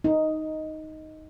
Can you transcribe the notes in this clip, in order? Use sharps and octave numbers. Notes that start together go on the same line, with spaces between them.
D#4